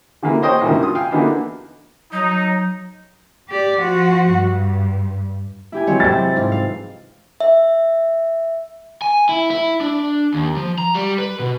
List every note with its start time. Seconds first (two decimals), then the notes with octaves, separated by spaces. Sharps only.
0.23 D3 E3 G#3 A#3
0.42 C5 C#5 D#5 G5 D#6
0.61 C#2 G2 D#3 E3 A#3
0.80 F4 D#6
0.95 F5 G5 G#5
1.11 D3 E3 A#3 B3 D4 D#4
2.12 F#3 D#4
3.49 G4 D5
3.80 F3 F#4
4.32 G2
5.72 E4 G4 G#5
5.87 E3 F#3 G#3 C4 C#5
6.00 C3 C4 E4 A6
6.36 G#2 F4
6.52 F5
7.40 E5
9.02 G#5
9.29 E4
9.51 E4
9.81 D4
10.34 D#2
10.57 F3
10.78 A#5
10.95 G3
11.18 B4
11.39 B2